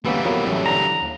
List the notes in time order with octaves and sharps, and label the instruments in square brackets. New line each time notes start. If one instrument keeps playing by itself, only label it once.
[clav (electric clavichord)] D2 B3 C#4 [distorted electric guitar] E3 G3 [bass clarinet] A#3
[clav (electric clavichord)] F2 F#3 A#3 [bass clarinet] B3
[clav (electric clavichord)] A1 A3 [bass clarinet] F#3
[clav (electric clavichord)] D3 [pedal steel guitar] A#5
[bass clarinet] D#2